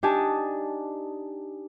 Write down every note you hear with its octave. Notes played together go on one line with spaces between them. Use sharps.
D4 D#4 G4 D#5 G#5 A5